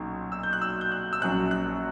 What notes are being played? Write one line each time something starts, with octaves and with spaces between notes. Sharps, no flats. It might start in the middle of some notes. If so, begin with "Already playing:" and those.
Already playing: B1 A#2 F#3 C#4
E6
G6
F#6
E6
G6
F#6
E6
A#1 A#2 F#3 C#4 F#6
F#6